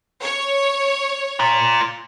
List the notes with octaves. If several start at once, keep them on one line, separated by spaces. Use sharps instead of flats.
C#5
F4 A#5